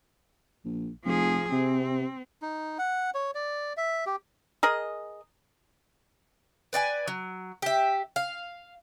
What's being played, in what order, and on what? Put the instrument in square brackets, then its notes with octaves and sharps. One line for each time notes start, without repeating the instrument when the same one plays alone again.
[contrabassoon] A#1
[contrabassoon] F1 [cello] F3 G#4
[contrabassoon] C3 [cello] C4
[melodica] D#4
F#5
C#5
D5
E5
G4
[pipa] G#4 A#4 D#5
[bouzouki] B4 D5 F#5 G#5
F#3
G4 E5
F5